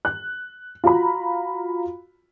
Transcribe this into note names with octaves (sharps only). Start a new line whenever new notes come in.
F#6
F4 F#4 A#5 B5